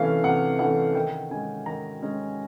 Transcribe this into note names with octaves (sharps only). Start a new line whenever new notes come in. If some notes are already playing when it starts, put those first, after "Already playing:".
Already playing: C3 E3 A3 C#4 F5
C3 F#5
E3 A3 C#4 F#5
D#3 G5
G#3 C#4 G#5
D#3 A#5
G#3 C#4